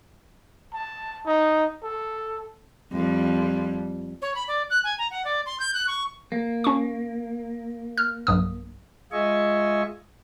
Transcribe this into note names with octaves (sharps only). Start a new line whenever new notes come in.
A5
D#4
A4
F2 G3
C#5
B5
D5
F#6
G#5
A#5
F#5
D5
C6
G6
F#6
C#6
A#3
C#4 C#6
F6
B1 G2 D#6
G#3 F4 D#5 E5 G#5 C#6